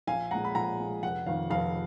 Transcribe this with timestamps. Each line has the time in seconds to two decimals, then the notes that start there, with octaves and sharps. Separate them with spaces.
0.07 A#1 F5 G#5
0.31 A#2 G#3 F#5 A#5
0.45 B5
0.55 A#1 F#5 A#5
0.79 A#2 G#3
1.03 F1 F#5
1.26 F2 D#3 F5
1.50 F1 F5